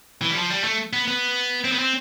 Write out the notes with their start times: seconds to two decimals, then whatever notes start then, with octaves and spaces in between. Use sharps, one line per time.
0.22 E3
0.31 G3
0.36 F3
0.50 G3
0.64 A3
0.93 B3
1.08 B3
1.65 C4
1.72 B3
1.79 C4